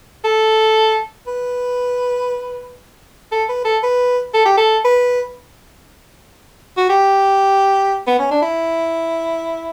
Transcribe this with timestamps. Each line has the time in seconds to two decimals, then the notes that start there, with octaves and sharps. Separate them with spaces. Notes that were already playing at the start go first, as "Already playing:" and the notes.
0.25 A4
1.27 B4
3.32 A4
3.49 B4
3.65 A4
3.83 B4
4.34 A4
4.46 G4
4.57 A4
4.85 B4
6.77 F#4
6.89 G4
8.07 B3
8.19 C#4
8.31 D4
8.42 E4